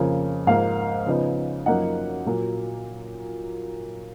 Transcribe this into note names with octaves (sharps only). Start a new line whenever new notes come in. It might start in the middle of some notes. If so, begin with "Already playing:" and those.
Already playing: F2 C#3 F3 A#3
G#2 F3 A#3 F5
C#3 F3 B3 D#4
F#2 F3 A#3 D#4 F#5
A#2 F#3 A#3